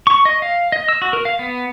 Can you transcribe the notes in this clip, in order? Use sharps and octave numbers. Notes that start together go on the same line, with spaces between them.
C#6
D#5
F5
D#5
E6
F#4
A#4
F5
B3